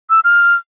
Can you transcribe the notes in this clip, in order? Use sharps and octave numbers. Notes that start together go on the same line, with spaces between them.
E6
F6